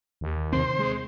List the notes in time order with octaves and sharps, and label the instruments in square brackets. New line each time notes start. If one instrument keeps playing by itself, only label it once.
[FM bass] D#2
[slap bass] C3 D#3 C4 [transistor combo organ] C5
[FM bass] G#3